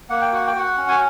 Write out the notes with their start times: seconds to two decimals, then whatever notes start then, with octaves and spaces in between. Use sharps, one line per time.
0.10 A#3 F#5
0.21 G5
0.32 F#4 F#5
0.47 G5
0.55 F#4 F#5
0.77 C#4
0.88 G#5